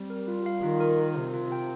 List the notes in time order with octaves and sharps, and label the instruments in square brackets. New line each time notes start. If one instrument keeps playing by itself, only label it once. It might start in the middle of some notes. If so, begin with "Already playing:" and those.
Already playing: [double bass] G3 [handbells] C4
[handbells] A#4
F4
F5
[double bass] D#3 [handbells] F4
[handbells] A#4
F4
[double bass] C3 [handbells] A#4
[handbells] F4
G5